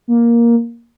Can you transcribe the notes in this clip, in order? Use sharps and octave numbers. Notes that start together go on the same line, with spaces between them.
A#3